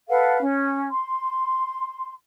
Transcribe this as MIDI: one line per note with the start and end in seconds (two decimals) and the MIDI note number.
0.09 0.39 69
0.09 0.39 71
0.09 0.39 77
0.09 0.39 78
0.41 0.89 61
0.91 2.13 84